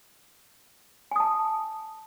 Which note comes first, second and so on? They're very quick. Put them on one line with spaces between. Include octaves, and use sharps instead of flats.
G#5 D#6 A5